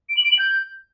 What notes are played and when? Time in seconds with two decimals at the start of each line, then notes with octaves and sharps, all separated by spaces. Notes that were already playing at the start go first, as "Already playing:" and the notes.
0.09 D7
0.17 F#7
0.24 D7
0.32 F#7
0.39 G6